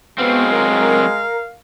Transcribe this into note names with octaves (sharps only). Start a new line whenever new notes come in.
F#3 G#3 B3 C4 F5
A#4